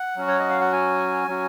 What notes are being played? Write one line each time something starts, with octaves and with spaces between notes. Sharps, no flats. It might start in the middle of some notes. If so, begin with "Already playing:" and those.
Already playing: F#5
F#3 C#4 F#4
C#5
D#5
F5
F#5
G#5
F#3 C#4 F#4